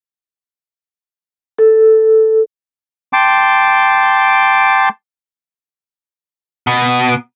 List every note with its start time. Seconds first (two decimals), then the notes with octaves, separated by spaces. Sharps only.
1.59 A4
3.13 G5 A5 C6 D6
6.67 B2